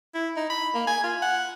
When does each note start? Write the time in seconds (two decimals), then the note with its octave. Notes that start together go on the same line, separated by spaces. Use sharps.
0.14 E4
0.37 D#4
0.50 B5
0.74 A#3
0.87 G#5
1.03 F4
1.22 F#5